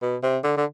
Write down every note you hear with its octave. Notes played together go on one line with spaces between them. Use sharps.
B2
C3
D3
D3